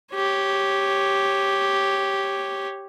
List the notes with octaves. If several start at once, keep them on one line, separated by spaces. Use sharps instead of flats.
G4 C#5